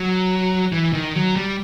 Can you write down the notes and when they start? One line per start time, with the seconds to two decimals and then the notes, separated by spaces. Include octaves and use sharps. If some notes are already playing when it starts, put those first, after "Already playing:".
Already playing: F#3
0.72 E3
0.93 D#3
1.15 F#3
1.36 G3